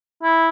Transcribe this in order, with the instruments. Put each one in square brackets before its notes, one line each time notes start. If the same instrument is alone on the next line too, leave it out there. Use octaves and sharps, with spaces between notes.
[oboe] E4